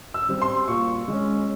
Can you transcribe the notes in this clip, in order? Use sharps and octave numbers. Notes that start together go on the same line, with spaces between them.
E6
G3 C4
C6
A#2 C#6
G#3 C#4